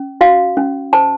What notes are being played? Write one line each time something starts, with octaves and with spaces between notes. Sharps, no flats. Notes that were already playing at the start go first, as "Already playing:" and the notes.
Already playing: C#4
F#4 F5
C#4
C5 A5